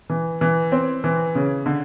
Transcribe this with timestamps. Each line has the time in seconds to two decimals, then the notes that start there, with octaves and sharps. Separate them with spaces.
0.10 E3
0.41 E3
0.72 C4
1.04 E3
1.35 C#3
1.66 D3